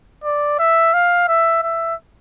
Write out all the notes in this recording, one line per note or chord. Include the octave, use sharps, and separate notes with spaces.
D5
E5
F5
E5
E5